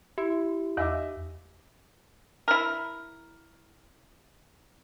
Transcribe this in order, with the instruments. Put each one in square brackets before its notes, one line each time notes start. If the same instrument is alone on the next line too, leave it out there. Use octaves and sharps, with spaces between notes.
[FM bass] E4 [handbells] G4
[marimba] E2 G#5 [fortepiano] D#5 E5 D6
[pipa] E4 A#4